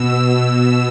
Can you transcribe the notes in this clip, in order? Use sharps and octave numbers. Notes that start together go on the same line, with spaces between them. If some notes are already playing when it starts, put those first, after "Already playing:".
Already playing: B2 E6
B2 E6